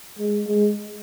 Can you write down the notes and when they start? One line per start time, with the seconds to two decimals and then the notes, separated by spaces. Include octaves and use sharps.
0.19 G#3
0.47 G#3